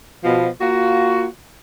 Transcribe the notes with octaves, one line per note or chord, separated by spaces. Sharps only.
B2 F3
A#3 F4 F#4